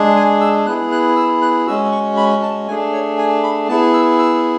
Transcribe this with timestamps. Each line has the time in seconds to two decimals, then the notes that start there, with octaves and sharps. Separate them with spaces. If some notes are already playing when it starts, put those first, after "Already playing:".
Already playing: G#3 D4 G#4
0.16 G#5
0.41 E6
0.66 B3 E4 G#4 F#6
0.92 F#6
1.16 E6
1.42 F#6
1.67 G#3 C#4 F#4 E6
1.92 C#6
2.17 B5
2.42 A5
2.68 A3 D4 G#4 G#5
2.93 C#5
3.18 G#5
3.43 B5
3.68 B3 E4 G#4 A5
3.93 E6
4.19 E6